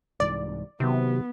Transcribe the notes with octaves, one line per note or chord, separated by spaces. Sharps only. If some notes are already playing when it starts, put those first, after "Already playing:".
C2 G#2 E3 D5
C3 D#3 F#3 B3